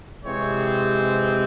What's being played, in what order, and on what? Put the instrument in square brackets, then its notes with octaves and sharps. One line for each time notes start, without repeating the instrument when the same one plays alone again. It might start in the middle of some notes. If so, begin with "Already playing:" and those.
[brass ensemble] C3 E3 G#3 C4 C#5